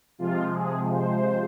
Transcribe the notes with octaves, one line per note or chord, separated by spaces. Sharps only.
C3 F3 G#3 F4
G#4
C5